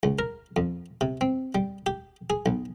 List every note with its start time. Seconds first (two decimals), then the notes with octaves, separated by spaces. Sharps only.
0.03 C#2
0.19 A#4
0.56 F2
1.01 C3
1.21 C4
1.55 G3
1.86 G4
2.30 G#4
2.46 B1